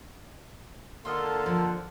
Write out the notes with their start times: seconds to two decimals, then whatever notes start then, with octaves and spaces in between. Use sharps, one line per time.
1.05 D3 A#3 F4 A4 D#5 F5
1.46 F3